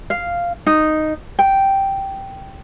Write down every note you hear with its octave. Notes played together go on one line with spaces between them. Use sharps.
F5
D#4
G5